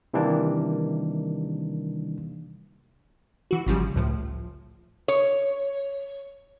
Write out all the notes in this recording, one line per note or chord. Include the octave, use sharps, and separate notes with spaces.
C3 D#3 E3 G3 A#3 D4
E3 F#4
G#1 C#3 F3 G3
C#2 A2 F3
C#5